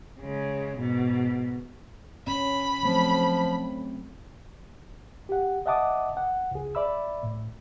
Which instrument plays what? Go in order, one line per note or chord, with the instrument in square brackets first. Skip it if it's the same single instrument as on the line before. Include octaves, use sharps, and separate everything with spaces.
[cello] C#3 G#3
G#2 B2
[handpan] C#4 [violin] B5
[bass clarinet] F3 [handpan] F#3 A3 C4
[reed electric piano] G4 F#5
D#5 E5 F#5 A5 D6 D#6
F#5
C#2 G#4
D5 E5 B5 E6
A2